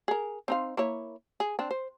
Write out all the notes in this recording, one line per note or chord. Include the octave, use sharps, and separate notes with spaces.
G#4 A#4
C4 D#4 F5
A#3 E4 C#5
G#4
C4 D4
C5